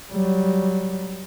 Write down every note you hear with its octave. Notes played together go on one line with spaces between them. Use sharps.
F#3 G3